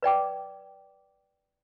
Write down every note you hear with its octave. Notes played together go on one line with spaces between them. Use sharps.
B4 D5 G5 D6